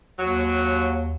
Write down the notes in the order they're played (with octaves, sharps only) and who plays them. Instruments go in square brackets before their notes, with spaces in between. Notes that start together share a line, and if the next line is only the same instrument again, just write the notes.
[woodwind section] D#2 [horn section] F#3